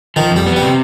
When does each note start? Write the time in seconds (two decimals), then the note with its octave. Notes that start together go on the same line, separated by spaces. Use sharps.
0.16 D#3 F3
0.31 F2
0.36 G3
0.46 B3
0.56 G3
0.62 C3